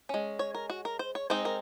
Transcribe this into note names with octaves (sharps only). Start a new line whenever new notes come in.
G#3 C#4
C#5
A#4
F#4
A#4
C5
C#5
G#3 C4 D#4 C5
A#4